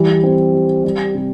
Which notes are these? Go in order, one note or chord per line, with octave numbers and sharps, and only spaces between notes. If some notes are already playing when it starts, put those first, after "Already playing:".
Already playing: E3 G3
C4
G3
G3
C3